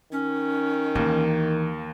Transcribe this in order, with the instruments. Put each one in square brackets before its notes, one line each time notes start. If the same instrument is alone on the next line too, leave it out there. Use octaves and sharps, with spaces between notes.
[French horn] D#3 [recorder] C#4
[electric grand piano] D#2 A#3 [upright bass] E3